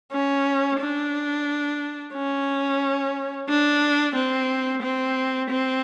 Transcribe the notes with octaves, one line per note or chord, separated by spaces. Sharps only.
C#4
D4
C#4
D4
C4
C4
C4